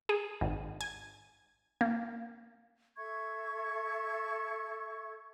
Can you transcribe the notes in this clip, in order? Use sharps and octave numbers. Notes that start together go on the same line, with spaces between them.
G#4
G#1
G#5
A#3
A4 E5 C#6 G#6